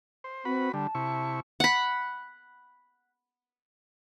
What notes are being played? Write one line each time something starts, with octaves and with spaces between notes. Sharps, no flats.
C5
C4 F#4 B4 B5
D3 G3 A5
C3 E4 C#6
F#5 B5